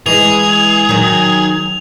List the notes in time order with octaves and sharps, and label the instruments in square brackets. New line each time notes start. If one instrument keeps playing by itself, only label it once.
[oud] E3 G#3 [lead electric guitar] G#4 [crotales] F7
[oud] D#3 F#3